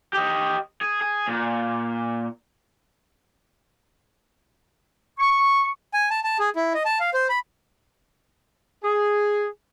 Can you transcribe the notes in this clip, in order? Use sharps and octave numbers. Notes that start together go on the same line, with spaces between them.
G4 D#5
G#4
G#4
A#2
C#6
G#5
A5
A5
G#4
E4
D#5
A5
F5
C5
B5
G#4